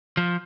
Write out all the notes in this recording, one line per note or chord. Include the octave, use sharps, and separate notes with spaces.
F3